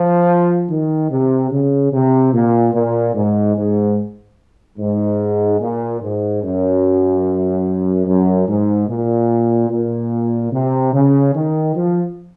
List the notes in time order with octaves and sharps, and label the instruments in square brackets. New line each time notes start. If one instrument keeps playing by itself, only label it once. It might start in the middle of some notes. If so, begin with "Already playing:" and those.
Already playing: [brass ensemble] F3
D#3
C3
C#3
C3
A#2
A#2
G#2
G#2
G#2
A#2
G#2
F#2
F#2
G#2
A#2
A#2
C3
C#3
D#3
F3